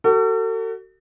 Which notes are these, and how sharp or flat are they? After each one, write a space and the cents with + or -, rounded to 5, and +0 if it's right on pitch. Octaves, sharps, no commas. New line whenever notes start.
F#4 +35 A4 +40